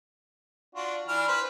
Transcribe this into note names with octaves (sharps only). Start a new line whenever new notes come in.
D4 F4 F#4
E3 D4 F6
B4 C5